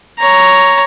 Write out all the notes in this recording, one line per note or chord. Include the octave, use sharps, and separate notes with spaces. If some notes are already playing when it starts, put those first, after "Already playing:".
C#5 A#5